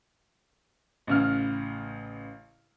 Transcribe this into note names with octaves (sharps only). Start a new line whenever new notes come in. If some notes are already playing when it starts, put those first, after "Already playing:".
A1 C#3 F6